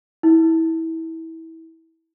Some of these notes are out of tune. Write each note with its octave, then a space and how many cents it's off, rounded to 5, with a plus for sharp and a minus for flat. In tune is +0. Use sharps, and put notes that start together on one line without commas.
E4 -25